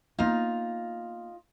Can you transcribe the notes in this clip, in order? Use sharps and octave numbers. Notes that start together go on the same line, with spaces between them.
A#3 B3 D#4 F4